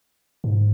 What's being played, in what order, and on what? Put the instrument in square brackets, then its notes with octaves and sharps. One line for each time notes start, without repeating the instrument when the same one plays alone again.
[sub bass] G#2